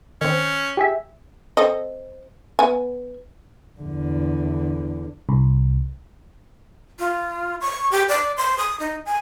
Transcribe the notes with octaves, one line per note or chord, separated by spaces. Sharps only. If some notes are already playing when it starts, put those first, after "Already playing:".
D#3 C4 C#4
G4 G#4 E5
C4 A4 D#5
B3 G#5
E2 D3
C2
F4
C#6
G4
D5
C6
D#6
D#4
G#5